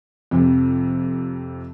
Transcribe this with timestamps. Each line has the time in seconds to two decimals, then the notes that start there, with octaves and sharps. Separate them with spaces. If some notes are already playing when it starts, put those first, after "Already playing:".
0.31 F2 C3